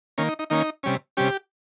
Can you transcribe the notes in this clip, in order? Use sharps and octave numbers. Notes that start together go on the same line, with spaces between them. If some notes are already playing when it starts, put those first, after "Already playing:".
D#3 A#3 C#4
D#4
D#4
D#3 A#3 C#4 D#4
C3 G3 C#4
C3 G3 C#4 G4